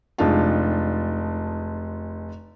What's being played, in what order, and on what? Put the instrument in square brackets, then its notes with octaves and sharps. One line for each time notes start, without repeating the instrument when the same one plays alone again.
[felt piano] F1 G#3 D4 D#4 F4 A5